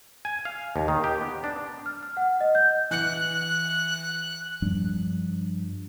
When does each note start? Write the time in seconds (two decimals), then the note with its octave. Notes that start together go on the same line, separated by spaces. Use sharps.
0.25 G#5
0.45 F5
0.76 D#2
0.88 D#3
1.04 G4
1.21 B3
1.44 D4
1.86 F6
2.03 F6
2.17 F#5
2.41 D#5
2.55 G6
2.91 E3 F#6 C#7
4.62 G2 F3 G3 D4